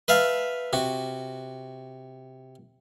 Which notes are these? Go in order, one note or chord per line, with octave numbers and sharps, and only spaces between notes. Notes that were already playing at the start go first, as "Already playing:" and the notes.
B4 E5 F5 A5
C3 F#4